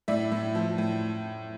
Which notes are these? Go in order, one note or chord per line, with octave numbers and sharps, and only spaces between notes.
A2 D5 E5
A2
F3
A2